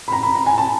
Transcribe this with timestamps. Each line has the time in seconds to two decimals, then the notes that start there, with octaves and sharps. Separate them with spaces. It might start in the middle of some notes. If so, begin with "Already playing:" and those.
0.08 B5
0.12 A#5
0.23 B5
0.35 A#5
0.46 G#5
0.58 A5